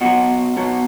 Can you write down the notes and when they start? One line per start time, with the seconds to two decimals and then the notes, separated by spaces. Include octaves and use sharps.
0.01 B2 F#3 F#4
0.57 B2 F#3